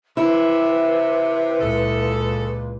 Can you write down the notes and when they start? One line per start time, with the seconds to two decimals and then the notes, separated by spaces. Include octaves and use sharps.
0.17 C3 E4 B4
1.60 C#2 A#2 C#4 G#4 A4